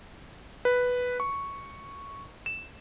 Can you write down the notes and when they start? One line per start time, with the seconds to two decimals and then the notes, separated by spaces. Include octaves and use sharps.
0.65 B4
1.20 C#6
2.46 E7